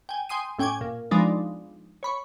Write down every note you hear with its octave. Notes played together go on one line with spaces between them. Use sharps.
G5 G#5
G5 G#5 C6 D#6 C7 D#7
A2 C#4 G5 G#5 D6 G#6
A#2
F3 G#3 B3 D4 D#4 D5
C#5 B5 C#6